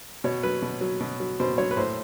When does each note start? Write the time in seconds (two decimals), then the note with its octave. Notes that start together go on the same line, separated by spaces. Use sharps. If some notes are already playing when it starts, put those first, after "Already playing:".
0.24 B2 C#5
0.43 F#3 B4
0.62 B2
0.81 F#3
1.01 B2
1.20 F#3
1.40 B2 C5
1.58 F#3 C#5
1.71 B4
1.77 A2 C5